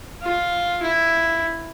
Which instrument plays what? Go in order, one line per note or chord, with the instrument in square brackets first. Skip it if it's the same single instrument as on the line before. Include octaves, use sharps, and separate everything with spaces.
[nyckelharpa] F4
E4